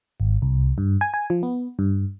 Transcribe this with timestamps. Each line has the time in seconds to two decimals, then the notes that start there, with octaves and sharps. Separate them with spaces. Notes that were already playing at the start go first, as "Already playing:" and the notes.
0.20 G#1
0.42 C2
0.78 G2
1.01 G#5
1.14 G#5
1.30 F3
1.43 B3
1.79 G2